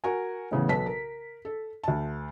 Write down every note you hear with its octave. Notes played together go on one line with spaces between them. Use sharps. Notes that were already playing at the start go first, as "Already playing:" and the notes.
F#4 A#4 G#5
A2 C#3 E3 B3
B1 A4 B4 A5 B6
A#4
A4
D2 A5